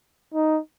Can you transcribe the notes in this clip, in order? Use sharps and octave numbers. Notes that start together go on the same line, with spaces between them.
D#4